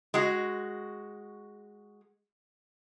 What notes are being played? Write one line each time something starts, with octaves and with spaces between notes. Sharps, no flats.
G#3 F#4